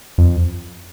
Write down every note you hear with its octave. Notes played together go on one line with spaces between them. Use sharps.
F2